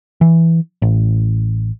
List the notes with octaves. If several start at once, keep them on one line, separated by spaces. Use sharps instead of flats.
E3
A1